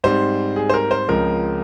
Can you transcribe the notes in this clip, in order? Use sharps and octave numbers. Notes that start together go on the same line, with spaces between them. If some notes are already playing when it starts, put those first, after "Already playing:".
G#2 G3 C4 C5
G#4
C5
A#4
C5
C#2 C#3 F3 G#3 C4 A#4